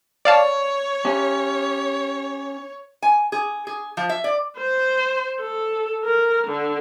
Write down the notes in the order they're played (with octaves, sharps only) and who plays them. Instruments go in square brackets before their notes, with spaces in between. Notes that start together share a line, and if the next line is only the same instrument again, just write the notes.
[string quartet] C#5 [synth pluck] D5 F5 A5
[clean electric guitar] C#4 G4
[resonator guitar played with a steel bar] G#5
G#4
G#4
F3
E5
D5
[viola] C5
A4
A#4
D3